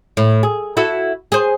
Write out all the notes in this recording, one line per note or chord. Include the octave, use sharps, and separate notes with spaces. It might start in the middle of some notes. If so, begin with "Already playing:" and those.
A2
G#4
E4 F#4 A4
G#4 C5